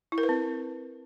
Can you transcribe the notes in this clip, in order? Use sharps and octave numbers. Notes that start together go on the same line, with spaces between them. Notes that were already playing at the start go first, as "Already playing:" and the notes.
E4
A#4
B4
C4